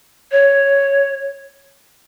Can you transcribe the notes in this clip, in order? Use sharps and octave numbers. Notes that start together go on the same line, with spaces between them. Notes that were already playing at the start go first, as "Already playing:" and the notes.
C#5